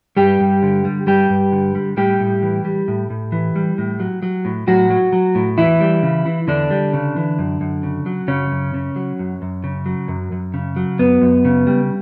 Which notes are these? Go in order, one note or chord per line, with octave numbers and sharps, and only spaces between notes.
G2 G3 G4
G2
D3
G3
G2 G3 G4
G2
D3
G3
A2 G3 G4
A2
E3
G3
A2
A2
E3
G3
A2
F#3
F#3
A2
A2 F#3 F#4
F#3
F#3
A2
E2 E3 E4
G3
C#3
E3
E2 D3 D4
G3
C#3
E3
F#2
F#2
C#3
F#3
F#2 C#3 C#4
F#2
C#3
F#3
F#2
F#2
C#3
F#3
F#2
F#2
C#3
F#3
F#2 B3
F#2
C#3
G3